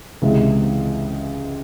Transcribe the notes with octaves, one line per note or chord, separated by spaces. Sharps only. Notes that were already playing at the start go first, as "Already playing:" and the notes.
C#2 C3 E3 G#3